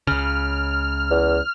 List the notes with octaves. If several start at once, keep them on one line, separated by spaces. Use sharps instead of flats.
C#2 C#3 F6
E2